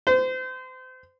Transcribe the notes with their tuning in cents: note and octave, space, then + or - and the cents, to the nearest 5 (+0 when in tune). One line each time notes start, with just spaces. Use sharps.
C5 -30